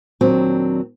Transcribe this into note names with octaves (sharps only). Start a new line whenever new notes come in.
D#2 A#2 F#3 C4 D4